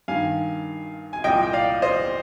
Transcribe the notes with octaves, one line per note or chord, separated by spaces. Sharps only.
G2 D#3 F5 G#5
G#5
C2 A#2 D#5 G5
G5
D5 F5
C5 D#5